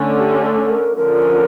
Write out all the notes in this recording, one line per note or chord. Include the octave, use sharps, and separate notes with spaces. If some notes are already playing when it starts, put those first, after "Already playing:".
Already playing: D3 A3 C#4
G4
A4
A#4
D3 F3 C#4 A#4